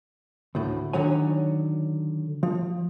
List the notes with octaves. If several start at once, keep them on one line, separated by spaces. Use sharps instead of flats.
D2 A2
D3 D#3 F#3 C#5 G#5
F3